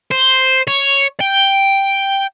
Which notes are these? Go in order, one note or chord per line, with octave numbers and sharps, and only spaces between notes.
C5
C#5
G5